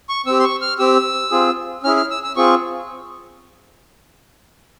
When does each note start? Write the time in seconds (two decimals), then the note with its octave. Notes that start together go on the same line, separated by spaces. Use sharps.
0.09 C#6
0.26 C4 G4 E6
0.39 C6
0.44 C#6
0.62 F6
0.79 C4 G4 E6
1.31 C4 F4 G#4
1.84 C#4 E4 G#4 F6
1.96 F6
2.10 E6
2.23 E6
2.36 C4 F4 G#4 C#6